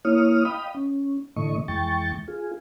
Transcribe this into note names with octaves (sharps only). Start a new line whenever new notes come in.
A#3 E4 C#5 D#6 F6
D#5 F5 G5 B5 D#6
C#4
A2 D3 E3 A3 D#5 C#6
F2 E3 G#3 G5 C#6 A6
F4 G#4